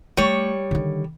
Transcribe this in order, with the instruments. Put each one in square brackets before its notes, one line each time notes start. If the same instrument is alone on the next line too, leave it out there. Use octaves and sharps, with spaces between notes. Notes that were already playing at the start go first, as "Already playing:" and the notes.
[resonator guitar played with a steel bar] G3 C#5 [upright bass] A3
[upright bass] D3 D#3